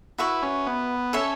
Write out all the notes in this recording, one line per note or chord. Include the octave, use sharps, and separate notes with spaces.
E4 F#4 B4 E5 C#6
C#4
B3
C#4 A4 C#5 E5